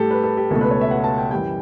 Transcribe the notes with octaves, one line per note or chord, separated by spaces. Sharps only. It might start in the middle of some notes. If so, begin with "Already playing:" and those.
Already playing: A2 G3 G4 A4
B4
A4
G4
C#2 B2 A3 A4
B4
C#5
E5
F#5
A5
G5
F#2 E3 G3 G5